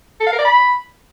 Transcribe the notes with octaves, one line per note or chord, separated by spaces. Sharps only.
A4
F5
A#4
D5
B5